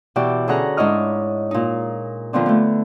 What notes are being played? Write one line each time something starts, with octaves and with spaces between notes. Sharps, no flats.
B2 E3 F#4 G4 D5
D3 C#4 G#4 A4 F#5 A#5
G#2 D4 E4 C#5 D#5 F6
A#2 D#4
D3 F3 B3 C4 D4
A3 B3